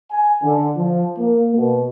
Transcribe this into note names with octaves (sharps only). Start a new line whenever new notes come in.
G#5
D3
F3
A#3
B2